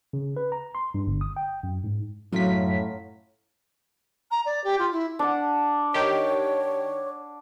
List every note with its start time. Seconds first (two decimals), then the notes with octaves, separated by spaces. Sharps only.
0.13 C#3
0.37 B4
0.52 A#5
0.75 C6
0.94 G2
1.07 G1
1.21 D#6
1.37 G5
1.63 F#2
1.84 G#2
2.32 F#2 A2 F#3 F4 B6
4.31 A#5
4.45 D5
4.64 G4
4.79 F4
4.91 E4
5.19 D4 F#5
5.94 D#3 G4 C#5